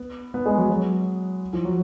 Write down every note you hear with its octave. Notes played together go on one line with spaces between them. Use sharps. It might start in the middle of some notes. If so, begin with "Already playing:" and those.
Already playing: B3
B3
G#3
F#3
F#3
F3
F#3